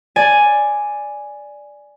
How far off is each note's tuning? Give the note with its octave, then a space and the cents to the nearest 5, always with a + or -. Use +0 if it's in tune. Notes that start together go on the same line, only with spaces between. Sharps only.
D5 +0 G#5 +0